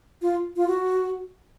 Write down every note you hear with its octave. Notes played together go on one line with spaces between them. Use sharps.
F4
F4
F#4